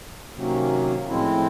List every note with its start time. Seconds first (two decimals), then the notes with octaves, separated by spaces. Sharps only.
0.35 C3 D#3 F#3 A#3 C#4
1.08 A2 F3 G#3 C4 E4